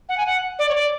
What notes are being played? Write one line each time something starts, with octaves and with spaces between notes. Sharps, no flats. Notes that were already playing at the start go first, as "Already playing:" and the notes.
F#5
G#5
F#5
D5
C#5
D5